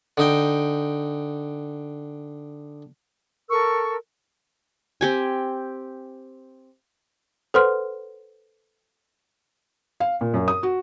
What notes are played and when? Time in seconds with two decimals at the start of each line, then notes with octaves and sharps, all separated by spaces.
0.17 D3 D#4 G5
3.50 A4 A#4 C#6 E6
5.01 C4 G4 G#5
7.54 A4 B4 C5 F#5 C6 F6
10.00 F5
10.21 A#2
10.34 F#2
10.48 D#6
10.63 F#4